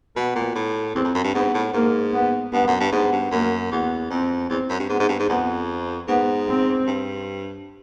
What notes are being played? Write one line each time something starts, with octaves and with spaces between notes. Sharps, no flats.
B2 B3
A#2
A2
E2 C4
F2
F#2
G2
G#2 B3
A2
G#2 A#3
B3
G2 B3
F#2
G2
G#2 B3
G2
F#2 A#3
E2 B3
F2 C4
E2 C4
F#2
G2
G#2 B3
G#2
G2
G#2
F2 B3
G#2 B3
C4
G2